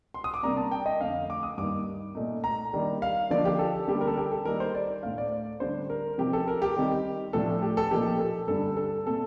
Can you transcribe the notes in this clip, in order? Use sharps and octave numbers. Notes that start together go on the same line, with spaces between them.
C6
D#6
D6
C3 G3 A#3 D4 A#5
A5
G5
D#5
F2 D3 A3 F5
D6
D#6
G2 D#3 A#3 D#4 D6
A#2 A3 D#4
A#5
D#3 G3 A#3 D4
F5
D3 F3 A#3 D#4 D5
G4
A4
D3 G3 A#3 G4
A#4
A4
G4
A4
D#3 G3 A#3 D#4 A#4
C5
D5
A2 A3 D4 F5
D5
D3 G3 D4 C5
A#4
C3 F3 C4 D#4 G4
A4
A#4
G4
D#3 G3 C4 D#4
A2 F3 A3 D4 A4
G4
A4
A#2 F3 A#3 D#4 G4
A4
G2 D3 G3 A4
A4
A#2 A3 C4 A4